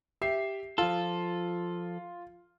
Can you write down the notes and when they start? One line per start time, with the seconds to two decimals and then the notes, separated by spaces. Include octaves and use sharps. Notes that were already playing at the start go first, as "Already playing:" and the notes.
0.21 G4 E5 C7
0.78 F3 F4 A4